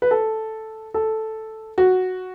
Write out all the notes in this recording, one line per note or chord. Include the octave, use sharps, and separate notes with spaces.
B4
A4
A4
F#4